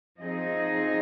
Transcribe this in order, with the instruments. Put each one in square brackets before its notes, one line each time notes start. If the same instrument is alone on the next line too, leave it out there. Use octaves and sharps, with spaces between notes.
[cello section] F3 C4 D#4 G#4 D#5